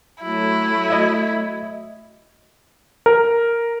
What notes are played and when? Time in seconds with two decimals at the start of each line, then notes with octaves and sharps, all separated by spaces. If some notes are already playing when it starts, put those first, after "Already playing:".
0.23 F#3 A3 E4
0.88 D#5 E5 G#6
3.06 A#4